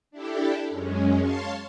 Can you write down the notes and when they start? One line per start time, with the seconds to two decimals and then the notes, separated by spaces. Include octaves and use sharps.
0.11 D4 E4 G4 A4
0.70 F#2 G#3 C#4
1.19 C#5 F5 A5 C6